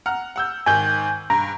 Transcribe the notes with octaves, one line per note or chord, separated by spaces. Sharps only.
F#5 A#5 F6
F#5 E6 G6
G#2 D#3 G#5 G6
G2 A#5